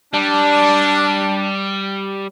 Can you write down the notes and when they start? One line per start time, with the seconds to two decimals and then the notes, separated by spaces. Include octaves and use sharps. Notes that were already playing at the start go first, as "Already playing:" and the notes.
0.14 G3 D4